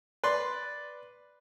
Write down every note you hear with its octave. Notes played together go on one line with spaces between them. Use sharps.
B4 D5 C6